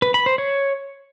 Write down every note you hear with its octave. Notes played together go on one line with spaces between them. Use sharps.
B4
B5
C5
C#5